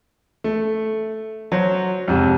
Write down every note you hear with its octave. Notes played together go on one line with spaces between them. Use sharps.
A3
F#3 C5
F2 G#2 C3